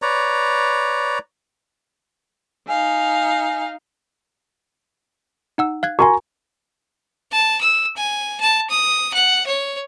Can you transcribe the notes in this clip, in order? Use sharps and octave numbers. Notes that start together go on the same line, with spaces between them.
B4 C#5 D5 A#5
D#4 F5 G#5
D#4 F#5 E6
F5 F#6 G#6
F#4 A#4 G#5 A#5 C6 C#6
A5
E6
G#5
A5
D#6
F#5
C#5